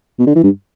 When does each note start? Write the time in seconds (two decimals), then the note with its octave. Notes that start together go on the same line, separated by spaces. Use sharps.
0.19 B2
0.27 D3
0.36 E3
0.44 G2